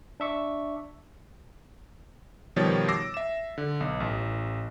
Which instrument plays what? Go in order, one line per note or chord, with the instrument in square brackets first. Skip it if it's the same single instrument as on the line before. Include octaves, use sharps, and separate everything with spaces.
[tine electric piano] D4 E5 C#6 D6
[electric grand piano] B2 D#3 F3 G3 C#5 A6
D6 E6 A#6 C7
E5 E7
D3
B1
A1